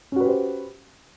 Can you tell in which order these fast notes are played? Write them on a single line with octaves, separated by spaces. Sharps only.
C#4 F#4 B4 G4 C5